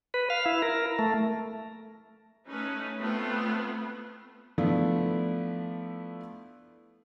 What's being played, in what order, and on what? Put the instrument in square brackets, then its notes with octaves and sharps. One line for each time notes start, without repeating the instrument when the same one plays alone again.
[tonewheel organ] B4
F5
E4
A#4
A3
[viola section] A3 C#4 D#4 B4
A3 B3 C4 F4
[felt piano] F3 A3 B3 D4 E4